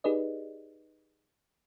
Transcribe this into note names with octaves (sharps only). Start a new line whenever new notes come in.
D#4 G4 G#4 B4 D5 D#5